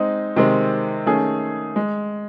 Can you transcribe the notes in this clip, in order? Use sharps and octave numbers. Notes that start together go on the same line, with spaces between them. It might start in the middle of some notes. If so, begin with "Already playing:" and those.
Already playing: G#3 C4 D#4
C3 D#3 G#3 C4
D#3 A3 C#4 G#4
G#3